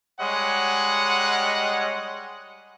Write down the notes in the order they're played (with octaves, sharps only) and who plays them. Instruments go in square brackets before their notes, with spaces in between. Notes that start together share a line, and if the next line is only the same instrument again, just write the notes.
[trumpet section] G3 G#3 C#5 D#5 F#5